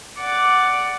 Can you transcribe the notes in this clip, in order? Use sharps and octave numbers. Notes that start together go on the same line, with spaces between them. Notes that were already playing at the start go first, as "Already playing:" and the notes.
D5 F#5